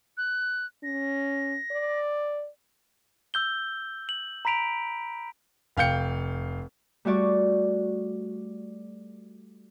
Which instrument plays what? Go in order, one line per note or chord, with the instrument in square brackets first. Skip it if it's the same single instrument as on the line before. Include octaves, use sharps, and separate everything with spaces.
[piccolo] F#6
[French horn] C#4 [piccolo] A#6
[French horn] D5
[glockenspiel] E6 G6 G7
F#7
A#5 B5 B6 D7 F7
[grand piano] F1 F5 G5 G6 C#7
[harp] G3 A3 F#4 D5 C#6